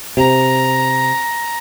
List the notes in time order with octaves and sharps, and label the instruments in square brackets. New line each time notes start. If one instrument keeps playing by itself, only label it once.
[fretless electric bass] C3 [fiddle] A#5